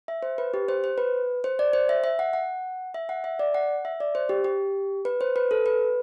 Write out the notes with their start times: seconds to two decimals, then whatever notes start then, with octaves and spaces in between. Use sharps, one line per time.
0.08 E5
0.23 C5
0.38 B4
0.54 G4
0.69 C5
0.84 C5
0.98 B4
1.44 C5
1.59 D5
1.73 C5
1.89 E5
2.04 E5
2.19 F#5
2.33 F#5
2.94 E5
3.09 F#5
3.24 E5
3.39 D5
3.54 F#5
3.85 E5
4.00 D5
4.15 C5
4.29 G4
4.44 G4
5.05 B4
5.21 C5
5.36 B4
5.51 A4
5.66 B4